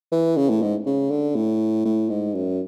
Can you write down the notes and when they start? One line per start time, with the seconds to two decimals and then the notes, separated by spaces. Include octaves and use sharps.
0.12 E3
0.37 C#3
0.50 A2
0.62 G#2
0.86 C#3
1.11 D3
1.35 A2
1.85 A2
2.09 G#2
2.35 F#2